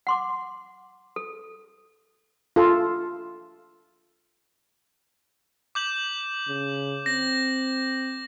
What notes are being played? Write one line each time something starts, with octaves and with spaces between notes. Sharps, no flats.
F#5 C6 D6
A4
F4 A4
D6 G6 F#7
C#3
C4 A#6